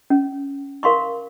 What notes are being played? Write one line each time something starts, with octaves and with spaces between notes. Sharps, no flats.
C#4
A#4 F5 C6 C#6